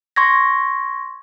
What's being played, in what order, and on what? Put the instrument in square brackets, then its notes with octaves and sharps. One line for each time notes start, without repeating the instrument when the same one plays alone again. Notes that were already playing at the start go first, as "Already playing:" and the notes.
[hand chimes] C6 C#6 G#6 A#6